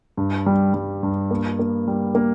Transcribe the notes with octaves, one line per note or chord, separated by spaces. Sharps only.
G2
G3
G3
G2
A#3
A#3
G3
A#3